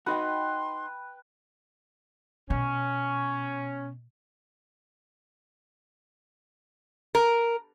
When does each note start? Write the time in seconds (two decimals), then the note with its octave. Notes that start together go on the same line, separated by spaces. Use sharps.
0.06 D#4 F#4 B4 G5 C6
2.50 B2 C#4
7.15 A#4